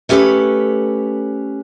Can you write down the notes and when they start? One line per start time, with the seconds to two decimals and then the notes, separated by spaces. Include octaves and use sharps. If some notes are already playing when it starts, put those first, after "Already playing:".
0.09 A3 C#4 G4 A4 B4 C#5